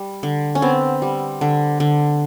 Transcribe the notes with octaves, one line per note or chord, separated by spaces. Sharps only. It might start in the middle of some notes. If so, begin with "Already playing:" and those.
Already playing: G3
D3
C#4
B3 C4
G3
D3
D3